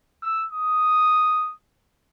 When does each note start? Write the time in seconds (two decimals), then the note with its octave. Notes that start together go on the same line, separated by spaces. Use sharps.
0.23 E6
0.52 D#6